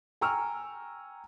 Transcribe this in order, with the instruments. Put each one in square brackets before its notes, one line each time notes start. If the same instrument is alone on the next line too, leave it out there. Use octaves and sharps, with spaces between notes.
[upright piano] G5 G#5 A#5 C#6 E6 F6